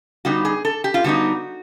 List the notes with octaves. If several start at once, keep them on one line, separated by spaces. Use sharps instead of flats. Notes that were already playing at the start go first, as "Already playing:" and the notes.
D3 G3 B3 D#4 F#4
G#4
A4
G4
F4
D3 G3 B3 D#4 F#4